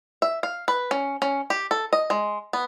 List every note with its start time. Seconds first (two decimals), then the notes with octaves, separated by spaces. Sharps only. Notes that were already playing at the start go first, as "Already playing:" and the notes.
0.22 E5
0.43 F5
0.68 B4
0.91 C#4
1.22 C#4
1.50 G4
1.71 A4
1.93 D#5
2.10 G#3
2.53 B3